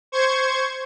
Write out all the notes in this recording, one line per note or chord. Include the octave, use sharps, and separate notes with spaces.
C5 C#6 G#6